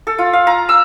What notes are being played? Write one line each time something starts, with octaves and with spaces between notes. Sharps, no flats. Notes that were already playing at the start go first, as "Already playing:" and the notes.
A4
F4
F5
A#5
E6